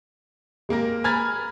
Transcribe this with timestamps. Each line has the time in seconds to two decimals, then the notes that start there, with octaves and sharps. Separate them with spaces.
0.69 G#3 A#3 G4 A#4
1.04 G#5 A#5 B5 F6 G#6 A6